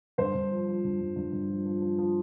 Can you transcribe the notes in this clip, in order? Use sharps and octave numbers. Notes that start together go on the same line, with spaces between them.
G2 C5
G2
F3
F3
G2
G2
G2
G2
F3
F3
F3
F3